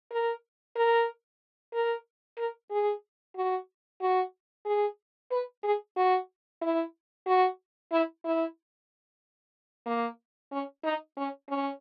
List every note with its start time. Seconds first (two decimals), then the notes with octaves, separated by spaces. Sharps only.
0.12 A#4
0.76 A#4
1.74 A#4
2.38 A#4
2.71 G#4
3.36 F#4
4.01 F#4
4.66 G#4
5.31 B4
5.64 G#4
5.97 F#4
6.62 E4
7.27 F#4
7.92 E4
8.25 E4
9.86 A#3
10.52 C#4
10.84 D#4
11.17 C#4
11.49 C#4